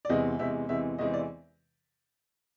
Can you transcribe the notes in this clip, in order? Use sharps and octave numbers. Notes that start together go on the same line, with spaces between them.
D5
E2 C3 E3 G#3 C4 D#5
E2 C3 E3 G#3 C4 E5
E2 C3 E3 G#3 C4 E5
E2 C3 E3 G#3 C4 D#5
D5